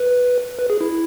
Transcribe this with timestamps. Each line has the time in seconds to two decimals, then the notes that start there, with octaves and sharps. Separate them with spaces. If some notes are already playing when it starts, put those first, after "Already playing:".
Already playing: B4
0.59 B4
0.70 G#4
0.81 E4